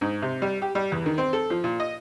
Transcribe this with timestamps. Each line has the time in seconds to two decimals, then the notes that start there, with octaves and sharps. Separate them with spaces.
0.01 G#2
0.22 C3
0.42 G3
0.62 G4
0.75 G3
0.92 E2
1.06 D#3
1.18 C4
1.33 A4
1.50 F3
1.64 A#2
1.80 D#5